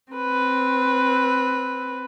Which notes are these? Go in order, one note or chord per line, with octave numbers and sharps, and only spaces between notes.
C4 B4